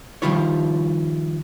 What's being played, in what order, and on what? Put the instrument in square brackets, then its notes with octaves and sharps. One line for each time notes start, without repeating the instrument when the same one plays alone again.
[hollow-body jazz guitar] D#3 F3 G3 E4 F4 C#5